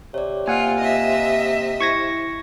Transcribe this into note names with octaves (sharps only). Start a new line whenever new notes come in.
C3 C#5 D5
A#3 F4 F5 F#5 G#5
D#5 E5
E4 C#6 G#6 A#6 C#7